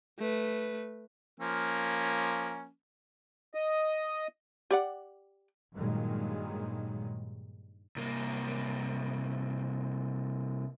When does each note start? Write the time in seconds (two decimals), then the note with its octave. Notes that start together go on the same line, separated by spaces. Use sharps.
0.19 A3 B4
1.40 F3 A#3 C#4
3.54 D#5
4.71 G4 D5 F#5
5.74 G2 A#2 D#3 F#3 G#3
7.96 C2 A#3